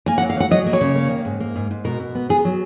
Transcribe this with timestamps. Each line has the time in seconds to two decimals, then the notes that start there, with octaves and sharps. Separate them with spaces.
0.06 A#3 G#5
0.18 F#5
0.22 F#3
0.30 F5
0.36 F#3 F#5
0.51 F#3 D#5
0.66 A#3
0.73 C#5
0.81 C#3
0.96 A#3
1.10 D#3
1.25 G#2
1.40 A#3
1.56 G#2
1.71 G#2
1.85 B2 A#4
2.00 B2
2.15 B3
2.29 B3 G#4
2.45 F#3